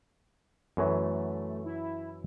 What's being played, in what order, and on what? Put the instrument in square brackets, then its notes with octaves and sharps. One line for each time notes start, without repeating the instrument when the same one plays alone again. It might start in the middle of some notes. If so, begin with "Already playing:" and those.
[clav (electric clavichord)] F#2 E3 F#3 [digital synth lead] A3
[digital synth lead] E4